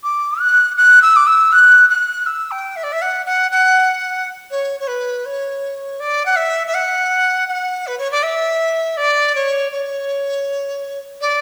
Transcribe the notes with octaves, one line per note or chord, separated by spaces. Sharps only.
D6
F#6
F#6
E6
D6
E6
F#6
F#6
E6
G5
E5
D5
E5
F#5
F#5
F#5
C#5
C#5
B4
C#5
D5
F#5
E5
E5
F#5
F#5
B4
C#5
D5
E5
D5
C#5
C#5
D5